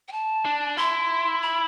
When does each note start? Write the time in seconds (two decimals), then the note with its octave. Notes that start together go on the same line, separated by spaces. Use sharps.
0.08 G5
0.12 A5
0.45 D4
0.77 E4 C6
1.42 B5